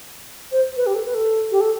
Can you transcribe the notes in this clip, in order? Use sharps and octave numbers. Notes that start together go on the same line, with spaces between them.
C5
B4
G4
A4
B4
A4
G4
A4